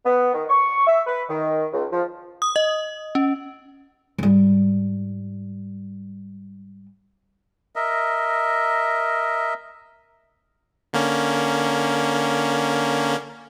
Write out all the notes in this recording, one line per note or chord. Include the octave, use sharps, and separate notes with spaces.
B3
D#3
C#6
E5
B4
D#3
C#2
F3
D#6
D#5
C#4
G#2 G3
A#4 D#5 E5
D3 A#3 C#4